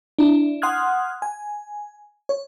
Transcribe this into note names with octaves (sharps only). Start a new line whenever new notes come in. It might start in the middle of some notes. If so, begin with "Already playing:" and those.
D4 E4
F#5 C6 D#6 F6 F#6 G#6
G#5
C#5